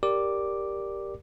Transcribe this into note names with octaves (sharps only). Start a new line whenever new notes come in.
G4 A#4 D5 D6